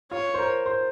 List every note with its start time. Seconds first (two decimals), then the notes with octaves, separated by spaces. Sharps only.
0.11 F4 C#5
0.34 C5
0.38 A#4
0.66 C5